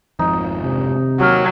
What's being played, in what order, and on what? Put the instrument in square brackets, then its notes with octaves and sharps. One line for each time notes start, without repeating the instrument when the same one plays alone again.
[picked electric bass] G#1 F2 F3 [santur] D#4
[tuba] C3
[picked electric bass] D#2 [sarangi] F#3 [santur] G4 F5